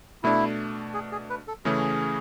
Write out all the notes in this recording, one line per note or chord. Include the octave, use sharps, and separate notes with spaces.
B2 A3 D4 E4
G#4
G#4
B4
A4
C#3 E3 A3 C#4 G#4